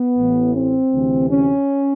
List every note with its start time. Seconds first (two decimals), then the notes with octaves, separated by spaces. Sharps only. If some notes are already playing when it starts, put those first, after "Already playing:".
Already playing: B3
0.18 A1 A2 E3
0.55 C4
0.93 D2 C3 E3
1.30 C#4